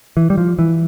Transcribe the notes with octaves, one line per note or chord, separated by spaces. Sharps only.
E3
G3
F3
E3